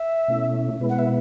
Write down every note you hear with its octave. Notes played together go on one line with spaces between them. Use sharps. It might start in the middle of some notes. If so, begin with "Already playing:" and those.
Already playing: E5
B2 A3 C#4 E4
B2 G#3 B3 E4 B4
F#5
E5